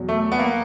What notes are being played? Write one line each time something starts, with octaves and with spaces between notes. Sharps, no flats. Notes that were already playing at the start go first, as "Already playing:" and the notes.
Already playing: E2 B2 F#3
A3
B3
A#3